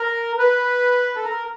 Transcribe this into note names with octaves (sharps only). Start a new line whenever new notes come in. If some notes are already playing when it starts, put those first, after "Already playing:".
Already playing: A#4
B4
A4
A#4